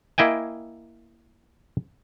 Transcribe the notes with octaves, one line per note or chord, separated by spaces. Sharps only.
A#3 E4 D#5 G5 G#5